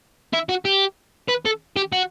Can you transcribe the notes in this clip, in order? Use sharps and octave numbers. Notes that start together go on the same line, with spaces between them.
E4
F#4
G4
B4
A4
G4
F#4